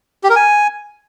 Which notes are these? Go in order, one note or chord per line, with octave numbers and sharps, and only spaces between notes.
G4
A#4
G#5